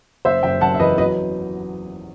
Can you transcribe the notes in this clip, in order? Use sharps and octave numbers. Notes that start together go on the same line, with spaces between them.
F#1 C5 E5
F#1 E5 G5
F#1 F#5 A5
E5
E2 B4 D#5
F#3 B4 D#5